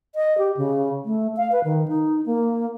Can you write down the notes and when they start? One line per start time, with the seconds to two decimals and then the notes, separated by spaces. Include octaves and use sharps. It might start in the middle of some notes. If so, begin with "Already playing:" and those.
0.15 D#5
0.38 G4
0.57 C#3
1.05 A3
1.37 F5
1.52 B4
1.64 D#3
1.88 D#4
2.26 A#3